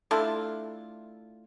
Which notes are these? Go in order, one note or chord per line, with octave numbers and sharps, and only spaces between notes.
A3 D4 E4 F4